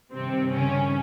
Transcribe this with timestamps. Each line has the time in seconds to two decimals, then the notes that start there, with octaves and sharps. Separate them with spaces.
0.13 G2 C3 D#3 G3 C4
0.52 C#3 C#4